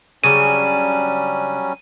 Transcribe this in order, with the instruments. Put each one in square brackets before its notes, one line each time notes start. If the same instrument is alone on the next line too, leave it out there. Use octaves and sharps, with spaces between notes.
[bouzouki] C#3 D4 [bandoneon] F#3 G3 C#4 [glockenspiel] D#7